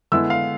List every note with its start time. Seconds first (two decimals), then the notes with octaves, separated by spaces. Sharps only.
0.12 D3 G#3 B3 E4 E6
0.30 F5